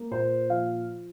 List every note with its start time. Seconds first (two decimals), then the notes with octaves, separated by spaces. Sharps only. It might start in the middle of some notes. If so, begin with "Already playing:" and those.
Already playing: A#3
0.11 A#2 C5
0.50 F3 F5